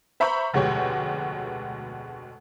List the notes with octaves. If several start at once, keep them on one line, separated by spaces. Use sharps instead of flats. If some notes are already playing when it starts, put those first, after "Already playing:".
C5 E5 A#5 B5 C#6 G6
F1 D2 B2 G#3 G4 C#5